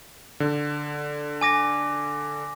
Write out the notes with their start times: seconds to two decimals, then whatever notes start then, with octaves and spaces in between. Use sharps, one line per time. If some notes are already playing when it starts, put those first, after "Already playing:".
0.40 D3
1.41 G#5 D6 A#6